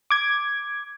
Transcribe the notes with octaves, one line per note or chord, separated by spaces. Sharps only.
D6 G#6